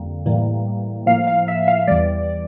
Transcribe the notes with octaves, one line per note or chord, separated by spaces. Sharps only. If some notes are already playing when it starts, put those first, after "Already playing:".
Already playing: F2 D3 G3 A#3
A2 E3 G3 A#3
A2 F3 A#3 F5
F5
E5
F5
E2 E3 G3 D5